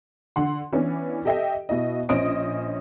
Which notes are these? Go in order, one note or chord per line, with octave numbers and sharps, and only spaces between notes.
D3 F#5 C6
E3 B3 C#4 D4
G4 A4 D#5 E5 G5
B2 E4 D#5
A#1 C#4 C5 D#5 D#6 D7